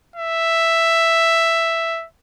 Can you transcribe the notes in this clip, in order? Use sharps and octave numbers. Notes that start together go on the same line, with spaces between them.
E5